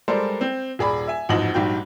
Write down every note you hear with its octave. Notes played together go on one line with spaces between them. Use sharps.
G3 G#3 A4 A#4 C5 D5
C4
D#1 G#4 D5 B5
E5 G#5
A1 F2 G#2 F#4 D#5 F#7
A#1 G#2 G3 F#4 G5